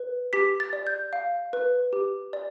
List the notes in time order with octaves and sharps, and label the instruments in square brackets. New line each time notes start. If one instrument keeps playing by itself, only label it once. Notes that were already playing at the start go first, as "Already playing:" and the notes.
Already playing: [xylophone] B4
G4 B6
A6
D5
G6
F5
B4
G4
D5